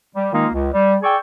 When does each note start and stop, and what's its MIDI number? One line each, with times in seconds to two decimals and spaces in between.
0.15 0.29 55
0.32 0.47 51
0.32 0.47 56
0.32 0.47 58
0.32 0.47 63
0.32 0.47 65
0.53 0.68 37
0.73 0.96 55
1.02 1.16 68
1.02 1.16 74
1.02 1.16 79
1.02 1.16 85
1.02 1.16 88